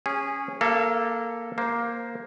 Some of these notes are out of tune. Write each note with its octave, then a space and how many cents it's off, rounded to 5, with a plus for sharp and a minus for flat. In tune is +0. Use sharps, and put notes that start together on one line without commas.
C#4 +0 G#4 -20
A#3 +0 A4 +0 F5 -45
A#3 +5 C5 +0